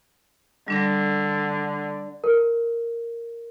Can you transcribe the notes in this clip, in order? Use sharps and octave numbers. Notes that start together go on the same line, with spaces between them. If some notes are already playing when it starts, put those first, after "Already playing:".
D3 G3 D4 A#6
A#4